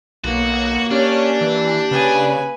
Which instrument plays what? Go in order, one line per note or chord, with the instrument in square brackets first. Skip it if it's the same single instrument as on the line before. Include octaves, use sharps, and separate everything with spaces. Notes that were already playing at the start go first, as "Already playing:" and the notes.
[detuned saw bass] B1 [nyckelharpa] A#3 [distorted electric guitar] F#4
[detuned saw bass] C#4 [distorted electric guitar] D4 [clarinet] G4
[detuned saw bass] E3
[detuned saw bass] C#3 [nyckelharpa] B4 G#5